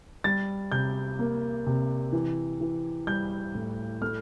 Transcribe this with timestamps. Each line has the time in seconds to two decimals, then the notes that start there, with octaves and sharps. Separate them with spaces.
0.24 G3 A6
0.72 C3 G6
1.19 A#3
1.67 C3
2.13 E3
2.61 E3
3.07 G3 G6
3.55 A2
4.02 A3 F6